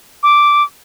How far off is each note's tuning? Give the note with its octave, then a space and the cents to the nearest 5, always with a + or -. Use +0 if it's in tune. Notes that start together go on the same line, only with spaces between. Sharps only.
D6 -5